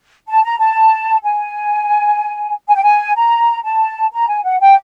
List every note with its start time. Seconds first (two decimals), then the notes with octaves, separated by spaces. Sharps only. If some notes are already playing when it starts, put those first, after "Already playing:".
0.28 A5
0.44 A#5
0.59 A5
1.24 G#5
2.68 G#5
2.75 G5
2.84 G#5
3.16 A#5
3.64 A5
4.12 A#5
4.28 G#5
4.44 F#5
4.60 G5